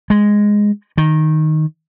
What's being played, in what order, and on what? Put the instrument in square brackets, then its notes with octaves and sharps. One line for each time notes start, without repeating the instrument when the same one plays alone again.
[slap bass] G#3
D#3